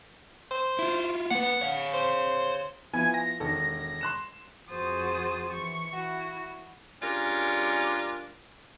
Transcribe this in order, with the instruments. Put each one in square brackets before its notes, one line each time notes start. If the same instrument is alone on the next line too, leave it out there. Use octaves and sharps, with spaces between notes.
[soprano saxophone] C5
[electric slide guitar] E4 F4
[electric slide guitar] A#3 B4 [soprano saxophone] F#5
[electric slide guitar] C#5 F5
[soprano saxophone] C5
[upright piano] F3 B3 E4 [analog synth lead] G#5
[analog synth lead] A#6
[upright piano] E1 D#3 A4
C6 F#6 E7
[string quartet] F2 F#4 G#4 C5 D#6 A6
E3 C#6
E4 F#4
[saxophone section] G#3 C#4 D4 F4 G4 A#4